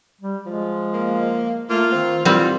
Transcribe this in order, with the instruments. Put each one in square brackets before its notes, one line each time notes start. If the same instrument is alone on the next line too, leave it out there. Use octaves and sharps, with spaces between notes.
[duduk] G3
[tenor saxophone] F3 [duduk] G#3
[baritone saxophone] A#3
[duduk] A3 [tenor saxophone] A#3 [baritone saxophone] F4
[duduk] D#3 [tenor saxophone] C4
[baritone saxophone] D#3 [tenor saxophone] E3 [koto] G3 C4 [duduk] F4